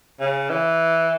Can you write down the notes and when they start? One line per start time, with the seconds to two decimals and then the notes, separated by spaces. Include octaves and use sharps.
0.20 C#3
0.50 E3